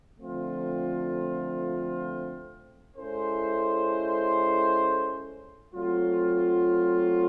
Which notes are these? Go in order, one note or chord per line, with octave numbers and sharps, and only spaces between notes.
D3 F3 A3 C4 F4
G#3 C#4 E4 A4 C5
F#3 A3 C4 F4